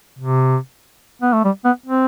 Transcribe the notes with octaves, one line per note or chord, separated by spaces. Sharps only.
C3
B3
A3
G3
B3
C4